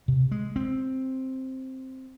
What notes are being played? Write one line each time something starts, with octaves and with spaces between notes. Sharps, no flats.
C3
G#3
C4